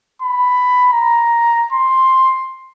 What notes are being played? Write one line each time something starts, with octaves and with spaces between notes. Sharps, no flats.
B5
A#5
C6